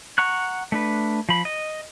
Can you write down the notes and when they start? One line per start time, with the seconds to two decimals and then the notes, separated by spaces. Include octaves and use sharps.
0.18 F#5 A#5 C#6 F#6
0.72 A3 D4 B4
1.29 F3 B5
1.45 D#5